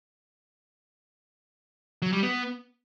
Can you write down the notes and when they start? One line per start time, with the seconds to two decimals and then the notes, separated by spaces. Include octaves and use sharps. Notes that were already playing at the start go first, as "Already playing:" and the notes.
2.02 F#3
2.12 G3
2.23 B3